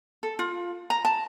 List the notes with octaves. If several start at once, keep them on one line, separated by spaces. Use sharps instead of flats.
A4
F4
A#5
A5